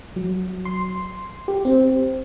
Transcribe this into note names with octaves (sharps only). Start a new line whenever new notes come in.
F#3
C6
G4
C4